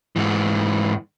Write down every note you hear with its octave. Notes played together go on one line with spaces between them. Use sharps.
G#2 E3